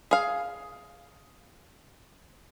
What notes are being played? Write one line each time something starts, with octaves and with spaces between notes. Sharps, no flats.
G#4 F5